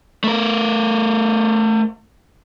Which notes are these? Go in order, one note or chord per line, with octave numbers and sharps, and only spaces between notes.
A3 A#4